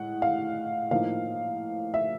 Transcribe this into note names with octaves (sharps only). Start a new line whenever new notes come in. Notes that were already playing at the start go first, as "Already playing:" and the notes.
Already playing: A2 G#3 F#5
F5
A2 F3 A#3 D#4 F5
E5